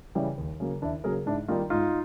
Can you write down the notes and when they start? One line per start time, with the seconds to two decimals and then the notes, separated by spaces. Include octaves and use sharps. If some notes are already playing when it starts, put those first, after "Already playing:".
0.15 C#3 E3 G3
0.38 D#2
0.60 C#3 F#3 A#3
0.82 D#2 D4 E4
1.04 C#3 F#3 A#3 G#4 A#4
1.26 G#2 D4 E4
1.48 D#3 G3 A#3 D#4 F4
1.70 G#2 D#4 F4